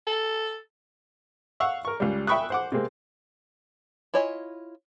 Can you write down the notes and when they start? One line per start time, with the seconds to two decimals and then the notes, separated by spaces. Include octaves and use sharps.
0.07 A4
1.60 F5 F#5 C#6 E6
1.85 A#4 C#6
2.00 C#2 G3
2.27 E5 G5 B5 C#6 D#6 F#6
2.50 C5 F#5 D6
2.72 C3 G#3 A#3 C4
4.14 E4 F4 C#5 D#5 G#5